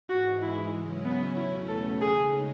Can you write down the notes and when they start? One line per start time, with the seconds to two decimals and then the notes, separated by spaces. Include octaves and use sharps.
0.09 G#2 E3 G#3 F#4
0.42 E4
0.74 C#3 F#3 C#4 E4
1.05 B3
1.37 E2 B2 A3 C#4 E4
1.68 A4
2.01 C#3 G#3 D#4 G#4